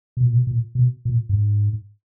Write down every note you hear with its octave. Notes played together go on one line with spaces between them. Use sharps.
B2
A#2
B2
A#2
B2
A#2
G2
G#2